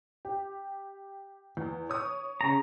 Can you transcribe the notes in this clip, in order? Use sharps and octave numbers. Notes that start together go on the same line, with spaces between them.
G4
E2
C#5 D#6
C#3 A#5